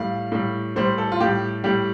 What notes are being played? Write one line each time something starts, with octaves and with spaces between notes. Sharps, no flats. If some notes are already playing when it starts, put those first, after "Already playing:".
Already playing: A2 G3 F5
A2 G3
A2 G3 C5
A4
F4
A2 G3 G4
A2 G3 G4